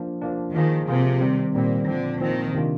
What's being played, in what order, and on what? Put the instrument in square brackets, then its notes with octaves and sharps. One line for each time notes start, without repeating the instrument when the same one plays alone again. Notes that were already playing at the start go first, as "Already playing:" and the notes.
Already playing: [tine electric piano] F3 A#3 D4
F3 A#3 D4
[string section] D#3 [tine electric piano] F3 A#3 F4 G#4
[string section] C3 [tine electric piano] F3 A#3 F4 G#4
[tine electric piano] D#3 G3 C4
[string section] A#2 [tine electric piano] D#3 G3 C4
[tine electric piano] A#2 F3 C4 [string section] D3
[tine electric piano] A#2 F3 C4 [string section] D#3
[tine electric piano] C3 D#3 A#3 D4 F4